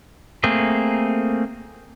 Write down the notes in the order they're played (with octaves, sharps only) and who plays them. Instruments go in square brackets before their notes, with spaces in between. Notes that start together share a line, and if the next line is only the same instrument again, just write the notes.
[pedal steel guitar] A3 A#3 C4 G#4